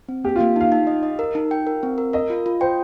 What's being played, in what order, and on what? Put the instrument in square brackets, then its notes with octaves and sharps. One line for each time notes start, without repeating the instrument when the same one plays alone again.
[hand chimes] C4
[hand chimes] A#3 [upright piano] G4
[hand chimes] A#3 [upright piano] F4
[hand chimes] D#4 [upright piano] F5
[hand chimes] D#4
D#5
D#5
A#4
D#4
G5
A#4
C4
A#4
[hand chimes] A#4 [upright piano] D#5
[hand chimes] F4
F4
[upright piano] C5 [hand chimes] G5